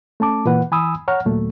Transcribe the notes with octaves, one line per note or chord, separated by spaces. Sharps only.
A3 C#4 A5 D6
A#2 E3 B4 F#5
E3 G#5 B5 D#6 E6
C#5 F#5 A#5 F6
D#2 A#2 F#3 A3